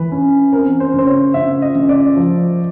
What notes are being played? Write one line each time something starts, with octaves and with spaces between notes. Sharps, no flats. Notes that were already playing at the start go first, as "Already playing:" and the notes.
Already playing: E3 B4
C#4
C4 A#4
C5
C#3 C5
C#5
C#3 E5
D#5
C#3
D5
F3